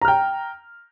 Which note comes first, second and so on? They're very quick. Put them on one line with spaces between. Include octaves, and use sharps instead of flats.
A#5 F6 G5